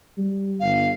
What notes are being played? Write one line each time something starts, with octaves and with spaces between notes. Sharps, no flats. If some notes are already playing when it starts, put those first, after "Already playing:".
G3
G1 F5